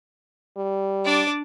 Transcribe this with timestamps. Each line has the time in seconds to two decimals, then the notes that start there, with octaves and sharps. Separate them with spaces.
0.57 G3
1.06 D4 D5